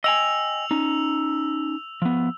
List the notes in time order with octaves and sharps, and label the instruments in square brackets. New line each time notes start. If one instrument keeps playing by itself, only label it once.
[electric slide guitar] D#5 G5 G#5 [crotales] E6 F7
[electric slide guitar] C#4 D#4
F3 B3